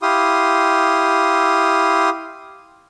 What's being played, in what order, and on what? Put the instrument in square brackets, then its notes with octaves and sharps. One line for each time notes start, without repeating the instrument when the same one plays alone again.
[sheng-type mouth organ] E4 G4 F5 C6 D#6